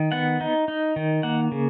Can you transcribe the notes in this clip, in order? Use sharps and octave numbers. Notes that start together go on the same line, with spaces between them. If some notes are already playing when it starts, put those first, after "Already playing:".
Already playing: D#3
B3 F#5
D#4
D#4
D#3
A#3 F#5
C#3